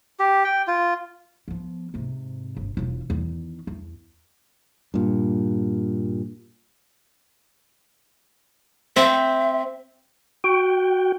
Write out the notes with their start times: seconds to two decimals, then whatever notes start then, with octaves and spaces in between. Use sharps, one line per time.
0.20 G4
0.44 G5
0.67 F4
1.48 F3 B3
1.94 G#2 C3
2.57 G1
2.77 E1 F4
3.10 E2 D#3
3.67 E2
4.94 G2 A#2
8.96 C4 E5
10.44 F#4 G5